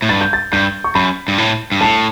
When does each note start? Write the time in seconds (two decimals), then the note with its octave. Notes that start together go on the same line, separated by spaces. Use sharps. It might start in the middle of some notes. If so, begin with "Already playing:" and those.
0.02 A2
0.09 G2 A6
0.21 G6
0.33 A6
0.53 G2 G6
0.84 C#6
0.95 F#2 B5
1.28 G2
1.38 A2
1.72 G2
1.81 A2 A5